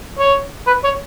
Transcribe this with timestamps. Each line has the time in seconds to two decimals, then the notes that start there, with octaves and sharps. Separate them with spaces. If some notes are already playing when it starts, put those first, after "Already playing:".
0.19 C#5
0.67 B4
0.84 C#5